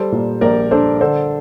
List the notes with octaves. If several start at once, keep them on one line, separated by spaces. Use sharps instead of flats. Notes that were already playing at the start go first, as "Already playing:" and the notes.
Already playing: G3 A4 C5
A#2
A#1 A#4 D5
D4 A4 C5
D3 A4 C5